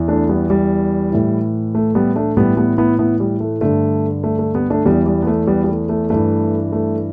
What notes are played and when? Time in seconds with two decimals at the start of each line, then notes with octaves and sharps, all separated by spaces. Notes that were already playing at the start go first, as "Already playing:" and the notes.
Already playing: E2 E3
0.08 A3 D4
0.29 G3 B3
0.50 G3
1.12 A2 E3
1.75 A3
1.95 G3 B3
2.16 A3 D4
2.37 A2 E3 G3 B3
2.57 G3 B3
2.78 B3 E4
2.99 B3 E4
3.20 G3
3.40 A3
3.61 G2 D3 A3
4.24 A3
4.39 A3
4.55 G3 B3
4.70 A3 D4
4.85 E2 E3 G3 B3
5.06 G3
5.22 B3
5.27 A3
5.47 G3 B3
5.64 G3
5.69 A3
5.89 A3
6.10 G2 E3 A3
6.72 A3